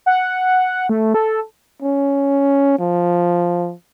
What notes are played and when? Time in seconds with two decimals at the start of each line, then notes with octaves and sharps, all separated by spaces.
0.06 F#5
0.89 A3
1.14 A4
1.82 C#4
2.79 F3